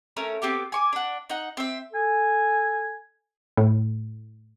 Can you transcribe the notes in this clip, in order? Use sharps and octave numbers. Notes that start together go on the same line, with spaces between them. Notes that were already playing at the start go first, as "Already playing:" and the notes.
A3 C#4 A#4
B3 C4 G4 D6
G#5 C#6 D6
D4 F#5
D#4 F#5
C4 E5
A4 G#5
A2